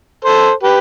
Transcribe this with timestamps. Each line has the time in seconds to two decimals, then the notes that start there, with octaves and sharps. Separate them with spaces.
0.25 A4 C5
0.63 G4 B4